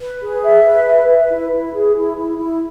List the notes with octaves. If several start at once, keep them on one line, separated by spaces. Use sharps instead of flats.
B4
G#4
E5
B4
E5
B4
E4
E4
G#4
E4
E4
E4